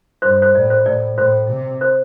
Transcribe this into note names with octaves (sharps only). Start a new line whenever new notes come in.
G2 C5
C5
A2 D5
C5
A2 D5
A2 C5
C3
C5